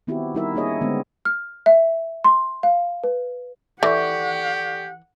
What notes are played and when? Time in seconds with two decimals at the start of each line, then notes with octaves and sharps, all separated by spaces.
0.07 D#3 B3 C4 E4 F#4 G4
0.35 G3 D#4 E4 A#4 E5
0.55 A#3 D4 D#4 G#4 C#5 D#5
0.81 D3 G#3 B3 C4
1.25 F6
1.66 E5
2.24 C6
2.63 F5
3.04 B4
3.83 E3 G4 A4 D5 F#5 C#6